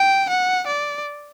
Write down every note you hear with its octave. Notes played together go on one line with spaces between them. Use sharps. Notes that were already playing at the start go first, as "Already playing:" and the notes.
Already playing: G5
F#5
D5